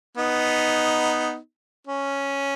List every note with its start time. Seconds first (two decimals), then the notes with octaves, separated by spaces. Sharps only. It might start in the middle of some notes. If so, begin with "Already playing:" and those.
0.18 B3 D#4
1.87 C#4